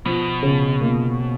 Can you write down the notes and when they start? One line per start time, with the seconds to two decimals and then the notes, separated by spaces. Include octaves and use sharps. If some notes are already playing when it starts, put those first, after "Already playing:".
0.06 B2 F3
0.43 C#3
0.81 A#3